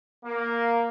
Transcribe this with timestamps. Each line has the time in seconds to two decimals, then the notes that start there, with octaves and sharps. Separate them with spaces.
0.24 A#3